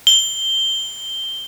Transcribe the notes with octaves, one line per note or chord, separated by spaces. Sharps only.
G7